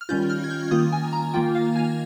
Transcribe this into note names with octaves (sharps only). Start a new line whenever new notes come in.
F6
D#3 G3 C#4 F4 G6
F6
G#6
G6
D#3 A#3 F4 D#6
G#5
A#5
D#3 A#3 F4 G5
F5
G#5